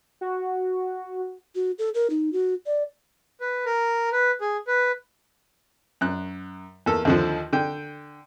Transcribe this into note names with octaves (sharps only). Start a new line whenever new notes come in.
F#4
F#4
A4
A#4
D#4
F#4
D5
B4
A#4
B4
G#4
B4
F#2 F#6
E2 A#3 A4
D#2 D3 F3
D3 G5